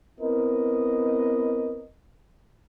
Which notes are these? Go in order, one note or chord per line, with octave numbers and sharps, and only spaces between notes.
B3 C4 E4 A#4 B4 D#5